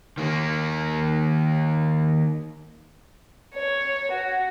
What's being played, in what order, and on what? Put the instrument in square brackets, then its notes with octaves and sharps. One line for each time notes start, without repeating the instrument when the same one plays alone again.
[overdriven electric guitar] D#3 A#3
[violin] C#5
F#4